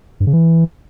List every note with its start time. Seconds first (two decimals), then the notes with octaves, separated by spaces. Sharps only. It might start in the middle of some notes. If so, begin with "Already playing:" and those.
0.20 G2
0.27 C#3
0.33 E3